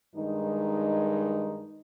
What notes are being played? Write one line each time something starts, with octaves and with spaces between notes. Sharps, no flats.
G2 D#3 G#3 D#4